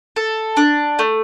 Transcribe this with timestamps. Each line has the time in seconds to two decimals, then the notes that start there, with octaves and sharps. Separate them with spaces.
0.16 A4
0.57 D4
0.99 A3